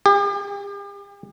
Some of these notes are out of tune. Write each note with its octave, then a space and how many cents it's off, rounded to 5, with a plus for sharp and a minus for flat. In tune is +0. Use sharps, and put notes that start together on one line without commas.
G4 +45